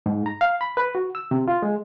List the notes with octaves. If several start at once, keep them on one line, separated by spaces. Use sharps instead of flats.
G#2
A#5
F5
B5
B4
F#4
E6
C3
F4
G#3